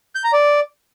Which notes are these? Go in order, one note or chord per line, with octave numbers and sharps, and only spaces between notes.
G6
A#5
D5